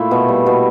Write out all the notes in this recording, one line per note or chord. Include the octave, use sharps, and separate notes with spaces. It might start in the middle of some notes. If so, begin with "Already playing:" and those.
Already playing: A#2 A3 E4
B2
G3
B2